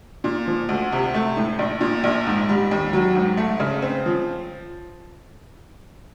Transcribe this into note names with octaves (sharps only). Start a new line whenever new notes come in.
A#2
F3
D2
C3
A3
A2
A#1
A#2
A#1
G#2
G3
D#2
F#3
G#2
A3
C#3
C4
F3